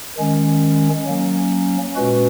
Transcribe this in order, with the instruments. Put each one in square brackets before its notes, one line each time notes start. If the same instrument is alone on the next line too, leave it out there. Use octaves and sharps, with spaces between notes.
[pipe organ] D#3 G#3 C#4
F#3 A#3 C#4
A#2 G#3 C#4 F#4 B4